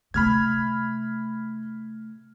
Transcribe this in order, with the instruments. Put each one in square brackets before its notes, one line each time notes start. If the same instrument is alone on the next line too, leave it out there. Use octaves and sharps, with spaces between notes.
[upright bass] C3 A3 [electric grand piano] B5 F6 G#6